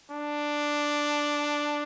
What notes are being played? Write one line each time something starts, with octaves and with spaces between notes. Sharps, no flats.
D4